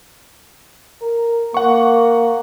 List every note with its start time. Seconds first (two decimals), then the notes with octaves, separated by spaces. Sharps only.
1.02 A#4
1.54 A#3 F#5 C#6